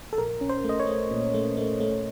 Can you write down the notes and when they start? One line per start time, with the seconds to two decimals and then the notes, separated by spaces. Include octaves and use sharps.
0.13 A4
0.18 A#1 A#4
0.41 C#4
0.49 C5
0.64 A3
0.69 D#5
0.80 C#5
0.87 A3
1.11 A#2
1.34 A3
1.57 A3
1.80 A3